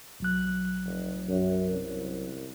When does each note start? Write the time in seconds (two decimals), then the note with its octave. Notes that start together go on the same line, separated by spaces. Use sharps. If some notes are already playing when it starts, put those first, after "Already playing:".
0.20 B1 F#3 F#6
0.85 F1
1.28 F#2
1.71 C2